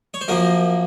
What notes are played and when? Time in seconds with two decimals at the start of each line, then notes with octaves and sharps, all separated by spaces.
0.14 C#5
0.21 C5
0.28 F#2 F3 A#3 A#4